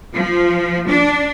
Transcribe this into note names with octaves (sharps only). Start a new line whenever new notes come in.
F3
D4